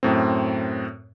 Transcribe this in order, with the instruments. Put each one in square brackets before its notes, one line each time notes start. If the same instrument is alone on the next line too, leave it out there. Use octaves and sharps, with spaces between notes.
[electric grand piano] F#2 A2 C4